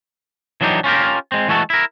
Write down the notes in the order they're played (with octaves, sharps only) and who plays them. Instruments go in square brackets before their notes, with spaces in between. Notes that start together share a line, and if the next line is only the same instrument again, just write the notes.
[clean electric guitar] E3 F#3 D4 D#4 G4
C#4 F4 G4 A#4
G#3 C4
E3 G#3 A3 F#4 A4
E4 A#4